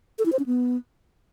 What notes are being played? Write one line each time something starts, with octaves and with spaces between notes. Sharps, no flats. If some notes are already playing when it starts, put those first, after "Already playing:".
A4
E4
C5
C#4
B3